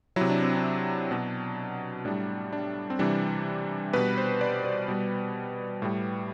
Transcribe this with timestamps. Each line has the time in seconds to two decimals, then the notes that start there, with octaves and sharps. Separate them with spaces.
0.16 C3 F#3 E4
0.30 D4
0.43 C4
0.57 D4
1.11 B2 F#3
2.05 A2 G3 D4
2.53 D4
2.90 C4
2.99 C3 E3 G3 D4
3.93 B2 G3 B4
4.18 C5
4.41 D5
4.64 B4
4.88 B2 G3
5.82 A2 G3